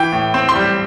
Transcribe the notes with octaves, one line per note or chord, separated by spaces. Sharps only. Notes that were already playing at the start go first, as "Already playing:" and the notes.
Already playing: E3 G5
A2
C4
C6
G3